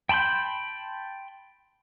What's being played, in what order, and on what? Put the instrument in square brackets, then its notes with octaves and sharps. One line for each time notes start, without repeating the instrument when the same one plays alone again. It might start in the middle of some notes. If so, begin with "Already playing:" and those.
[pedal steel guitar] G5 A5 B5 C6 G6